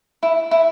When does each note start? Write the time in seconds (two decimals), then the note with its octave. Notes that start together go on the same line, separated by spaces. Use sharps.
0.23 E4
0.51 E4